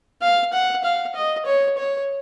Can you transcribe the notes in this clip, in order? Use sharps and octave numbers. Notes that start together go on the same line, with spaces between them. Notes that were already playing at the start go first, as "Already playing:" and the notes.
F5
F#5
F5
D#5
C#5
C#5